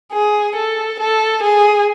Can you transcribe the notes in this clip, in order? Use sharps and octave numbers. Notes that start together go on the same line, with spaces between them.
G#4
A4
A4
G#4